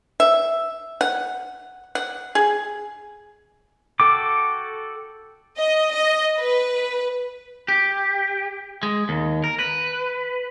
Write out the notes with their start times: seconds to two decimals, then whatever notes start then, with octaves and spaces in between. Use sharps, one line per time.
0.20 E5
1.01 F#5
1.95 F#5
2.35 G#4
4.00 F#4 A4 G5 D6
5.57 D#5
5.91 D#5
6.39 B4
7.68 G4
8.83 G#3
9.09 D#2
9.44 A#4
9.59 B4